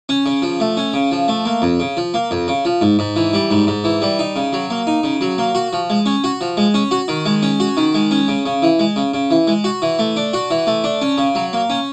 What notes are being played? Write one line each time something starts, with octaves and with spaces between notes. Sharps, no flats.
C#4
C#3
F3
A3
C#4
C#3
F3
A3
A#3
F2
C#3
F3
A#3
F2
C#3
F3
G#2
G#2
E3
G3
G#2
G#2
E3
G3
D#4
C#3
F#3
A#3
D#4
C#3
F#3
A#3
F#4
F3
G#3
C#4
F#4
F3
G#3
C#4
F#4
D#3
G#3
C#4
F#4
D#3
G#3
C#4
C#3
C#3
E3
G#3
C#3
C#3
E3
G#3
F#4
E3
A3
D4
F#4
E3
A3
D4
C#4
C#3
F#3
A#3
C#4